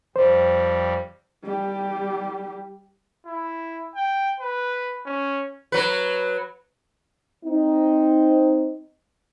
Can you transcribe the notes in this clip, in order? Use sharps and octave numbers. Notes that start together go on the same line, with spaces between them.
F2 G3 C5
G3 G4
E4
G5
B4
C#4
F#3 B4
C4 D#4